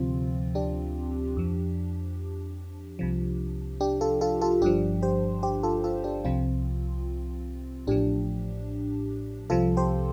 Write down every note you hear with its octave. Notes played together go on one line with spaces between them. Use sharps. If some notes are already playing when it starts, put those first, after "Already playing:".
Already playing: D2 C3 F3 C4 F4
D4 G4
F2 F3
C2 C3 F3
D4 G4
F4 A4
F4 A4
F4 A4
G1 G2 F3 D4 G4
G4 C5
G4 C5
F4 A4
F4 A4
D4 G4
C2 C3 F3 C4 F4
A1 A2 F3 D4 G4
C2 C3 F3 F4 A4
G4 C5